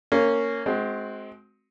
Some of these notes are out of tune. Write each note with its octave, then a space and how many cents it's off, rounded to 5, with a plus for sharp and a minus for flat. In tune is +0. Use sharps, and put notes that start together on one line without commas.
A#3 -15 C#4 +0
G#3 +30 C4 +0 F#4 -5